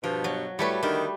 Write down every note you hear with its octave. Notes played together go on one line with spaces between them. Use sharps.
G2 B2 F3
F#3
A2 G3 A3 B4 C#5
D3 D#3 G3